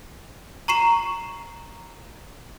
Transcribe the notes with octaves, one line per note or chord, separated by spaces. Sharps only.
A#5 C#6 C7 E7